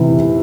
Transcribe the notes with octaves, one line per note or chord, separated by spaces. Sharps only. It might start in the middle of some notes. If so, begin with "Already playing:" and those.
Already playing: C3 E3